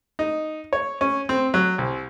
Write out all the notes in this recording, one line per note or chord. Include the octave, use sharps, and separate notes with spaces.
D#4
C#5
C#4
C4
F#3
C2